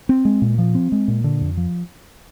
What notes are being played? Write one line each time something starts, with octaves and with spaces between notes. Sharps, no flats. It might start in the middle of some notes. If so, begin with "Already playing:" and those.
C4
G#3
A#2
F3
C4
G#3
A#2
D3
F2
F3